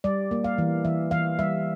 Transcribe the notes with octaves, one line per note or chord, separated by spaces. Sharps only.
G3 D5
A#3
F5
E3
E3 E5
E3 F5
G3 E5